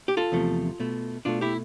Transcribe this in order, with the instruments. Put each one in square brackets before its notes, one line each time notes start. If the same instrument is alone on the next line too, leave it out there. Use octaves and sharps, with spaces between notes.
[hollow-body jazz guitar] G4
F4 A4
E2 C3 F3 A3
B2 A3
B2 A3 D4 F4
E4 G4